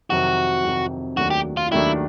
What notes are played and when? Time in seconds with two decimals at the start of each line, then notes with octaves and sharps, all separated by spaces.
0.10 F2 C3 D#3 F#3 F#4
0.64 F2 C3 D#3 F#3
1.17 D#2 D#3 F#3 A3 D4 F#4
1.30 G4
1.57 F4
1.71 D#2 D#3 F#3 A3 D4 E4